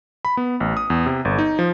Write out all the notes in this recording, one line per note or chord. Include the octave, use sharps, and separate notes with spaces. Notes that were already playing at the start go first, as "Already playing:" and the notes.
B5
B3
A1
D#6
E2
C3
G1
D#4
F3